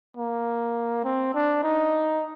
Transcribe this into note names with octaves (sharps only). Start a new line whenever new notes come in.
A#3
C4
D4
D#4